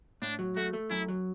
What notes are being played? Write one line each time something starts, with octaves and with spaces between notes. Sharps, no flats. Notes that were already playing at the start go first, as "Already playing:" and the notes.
A2 D4
F#3
A3 F#4
A3
F#2 E4
F#3